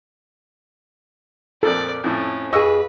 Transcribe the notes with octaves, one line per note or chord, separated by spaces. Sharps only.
F2 A#2 F3 A4 D5
F2 A2 C#4
F2 G#4 B4 D#5 C#6 E6